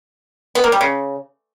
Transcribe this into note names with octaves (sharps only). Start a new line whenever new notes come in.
B3
A#3
G3
C#3